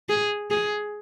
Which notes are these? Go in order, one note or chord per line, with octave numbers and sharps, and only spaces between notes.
G#4
G#4